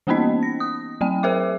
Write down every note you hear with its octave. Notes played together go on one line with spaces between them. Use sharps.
E3 A#3 B3 C#4 D#4 D#5
A#6
D#6
F#3 C4 G5
G#4 A#4 C5 E5 D6